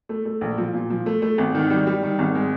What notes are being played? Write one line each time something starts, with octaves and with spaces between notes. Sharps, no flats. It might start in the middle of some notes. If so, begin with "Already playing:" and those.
A3
A3
A#1
F3
A#2
F3
A3
A3
G#1
D#3
G3
G3
D#3
G#1
G#3